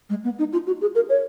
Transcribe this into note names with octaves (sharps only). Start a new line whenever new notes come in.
G#3
B3
D#4
F4
F#4
G#4
A#4
C#5